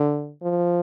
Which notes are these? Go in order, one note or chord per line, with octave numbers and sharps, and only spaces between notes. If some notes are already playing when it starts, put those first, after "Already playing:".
Already playing: D3
F3